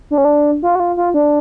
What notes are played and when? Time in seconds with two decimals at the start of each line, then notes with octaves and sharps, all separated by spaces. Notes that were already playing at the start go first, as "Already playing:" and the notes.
0.11 D4
0.18 C#4
0.25 D4
0.63 F4
0.75 F#4
0.80 F4
0.97 F4
1.14 D4